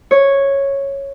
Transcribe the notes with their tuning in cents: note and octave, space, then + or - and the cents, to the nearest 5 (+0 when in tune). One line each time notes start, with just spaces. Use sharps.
C#5 -5